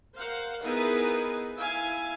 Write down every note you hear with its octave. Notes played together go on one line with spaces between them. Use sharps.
A#4 C5 F5 F#5
B3 D#4 E4 G#4 A#4 B4
E4 F5 G#5